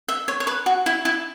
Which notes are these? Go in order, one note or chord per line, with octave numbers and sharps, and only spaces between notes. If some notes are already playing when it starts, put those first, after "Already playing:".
E5
C#5
C#5
B4
F#4
E4
E4